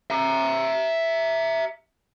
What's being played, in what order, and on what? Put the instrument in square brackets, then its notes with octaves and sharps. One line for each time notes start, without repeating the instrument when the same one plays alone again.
[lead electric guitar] E5 A#5